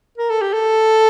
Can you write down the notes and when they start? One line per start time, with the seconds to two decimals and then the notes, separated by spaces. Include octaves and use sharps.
0.18 A#4
0.30 A4
0.42 G4
0.53 A4